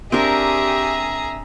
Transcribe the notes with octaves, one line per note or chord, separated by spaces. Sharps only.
C4 D4 G4 G#4 A#4 E5 A#5